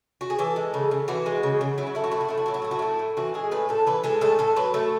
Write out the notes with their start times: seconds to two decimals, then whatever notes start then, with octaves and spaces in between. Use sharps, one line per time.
0.21 F#4
0.30 G#4
0.39 E3 A4
0.56 G#3
0.74 C#3
0.91 C#3
1.08 E3 F#4
1.26 G#3
1.43 C#3
1.61 C#3
1.78 F#3 E4
1.87 F#4
1.95 A3 E4
2.04 F#4
2.12 A2 E4
2.21 F#4
2.29 A2 E4
2.37 F#4
2.46 F#3 E4
2.54 F#4
2.62 A3 E4
2.71 F#4
2.79 A2 E4
2.99 A2
3.17 E3 F#4
3.34 G#3 G#4
3.51 A2 B4
3.69 A2 A4
3.87 E3 B4
4.04 G#3 A4
4.21 A2 A4
4.39 A2 A4
4.56 F#3 B4
4.74 A3 A4